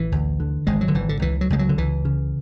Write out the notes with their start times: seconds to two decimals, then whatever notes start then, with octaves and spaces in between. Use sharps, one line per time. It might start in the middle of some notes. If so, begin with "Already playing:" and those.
Already playing: A1 E3
0.12 D2
0.40 D3
0.67 G#1 G#3
0.81 F#3
0.88 D3
0.95 G#1 E3
1.09 D3
1.22 C#2 E3
1.41 F#3
1.50 C#2 G#3
1.59 F#3
1.69 D3
1.78 C#2 E3
2.05 C#3